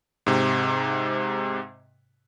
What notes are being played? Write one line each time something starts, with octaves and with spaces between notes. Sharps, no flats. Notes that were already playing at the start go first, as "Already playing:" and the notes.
G#2 C3